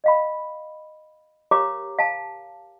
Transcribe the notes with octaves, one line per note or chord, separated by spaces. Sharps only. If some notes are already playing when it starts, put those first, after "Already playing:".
D#5 F5 B5
G4 A#4 C#5 F5 A#5 D6
F5 A5